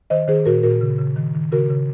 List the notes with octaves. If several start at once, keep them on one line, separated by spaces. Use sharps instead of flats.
D#3 C5 D#5
D#3 G#4 C5
A#2 F#4 A#4
A#2 F#4 A#4
C#3
C#3
D#3
D#3
C#3 F#4 A#4
C#3